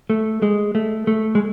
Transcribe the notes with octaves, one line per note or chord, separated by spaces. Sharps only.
A3
G#3
A3
A3
G#3